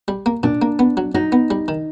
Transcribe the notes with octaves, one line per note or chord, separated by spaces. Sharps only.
G3
A#3
A#2 D4
A#3
B3
F#3
F#3 D#4
B3
G3
D#3